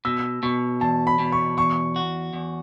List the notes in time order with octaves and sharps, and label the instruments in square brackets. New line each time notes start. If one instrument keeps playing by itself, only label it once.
[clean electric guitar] B2 [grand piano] E6
[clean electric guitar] B2 [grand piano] C#6
[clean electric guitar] E2 [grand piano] A5
[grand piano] B5
[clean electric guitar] B2
[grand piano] C#6
[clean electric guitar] E2 [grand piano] C#6
[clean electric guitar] F#4
E2